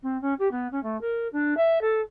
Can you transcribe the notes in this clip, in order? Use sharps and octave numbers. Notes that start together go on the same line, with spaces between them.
C4
C#4
G4
B3
C#4
A3
A#4
D4
E5
A4